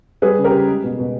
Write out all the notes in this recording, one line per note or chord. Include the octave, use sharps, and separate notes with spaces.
G3 G#4 B4
C#3
G4 A#4
C#3
G#3
B2
B2